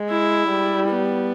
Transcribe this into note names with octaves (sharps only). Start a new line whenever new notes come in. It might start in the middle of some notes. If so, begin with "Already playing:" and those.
Already playing: G#3
E4
G3
B3